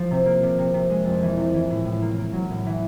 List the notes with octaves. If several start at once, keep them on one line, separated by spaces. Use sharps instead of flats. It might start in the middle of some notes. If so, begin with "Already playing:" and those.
Already playing: F3
C3
A#3
C3
C3
C3
G#3
F2
E3
C3
E3
A2
A2
A#3
A#3
F#3
A2
E3